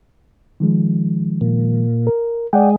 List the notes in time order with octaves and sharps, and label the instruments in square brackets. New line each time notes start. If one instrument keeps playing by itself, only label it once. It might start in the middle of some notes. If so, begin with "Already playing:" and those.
[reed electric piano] D#3 F3 G#3
[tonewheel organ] A#2
[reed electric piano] A#4
[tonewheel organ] G#3 [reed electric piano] D5 F#5 G5